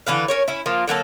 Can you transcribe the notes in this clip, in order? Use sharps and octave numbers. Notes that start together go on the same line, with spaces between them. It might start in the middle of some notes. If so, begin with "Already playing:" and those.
D3 E3 B4 F5
C#4 A#4 C#5
C#4 E4
F3 A#3 F4
D3 F#3 A#3 A4